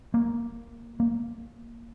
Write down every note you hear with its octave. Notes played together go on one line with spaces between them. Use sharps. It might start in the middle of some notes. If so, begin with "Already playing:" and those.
A#3
A#3